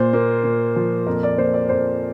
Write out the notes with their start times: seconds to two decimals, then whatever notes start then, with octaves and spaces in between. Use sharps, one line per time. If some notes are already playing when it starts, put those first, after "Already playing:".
Already playing: A#2 C5
0.13 A#3
0.44 A#2
0.76 F3
1.06 F2 A#4
1.23 D5
1.38 A#3 C5
1.54 D5
1.69 F2 C5